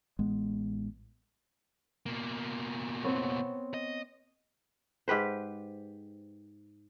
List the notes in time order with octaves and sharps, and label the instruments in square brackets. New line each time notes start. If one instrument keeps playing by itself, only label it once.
[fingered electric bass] A1 G#3 B3
[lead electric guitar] B2 A#3
[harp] B3 C4 C#5
[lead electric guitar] D#5
[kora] G#2 G4 B4 C5